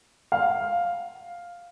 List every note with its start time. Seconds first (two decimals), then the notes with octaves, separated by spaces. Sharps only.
0.32 F5